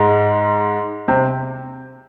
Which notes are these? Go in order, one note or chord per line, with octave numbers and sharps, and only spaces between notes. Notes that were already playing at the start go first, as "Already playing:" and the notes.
Already playing: G#2 G#3
C3 C4